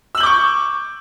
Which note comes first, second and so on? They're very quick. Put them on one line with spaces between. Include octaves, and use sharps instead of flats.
E6 F#7 G6 D6 C#6